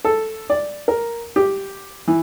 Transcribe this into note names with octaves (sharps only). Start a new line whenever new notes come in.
A4
D5
A#4
G4
E3